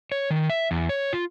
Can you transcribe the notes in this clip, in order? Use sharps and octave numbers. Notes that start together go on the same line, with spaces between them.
C#5
D#3
E5
E2
C#5
F4